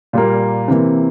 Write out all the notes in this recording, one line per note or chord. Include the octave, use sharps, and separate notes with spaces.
A#2 G3 A#3
C3 E3 A#3